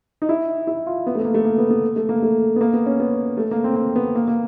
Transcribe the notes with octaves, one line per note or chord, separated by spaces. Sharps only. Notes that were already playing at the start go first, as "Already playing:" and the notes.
D#4
E4
E4
F4
B3
A3
B3
A#3
A3
A#3
B3
B3
A3
A#3
A3
B3
A#3
B3
C#4
B3
A3
A#3
C4
C4
B3
A#3
A#3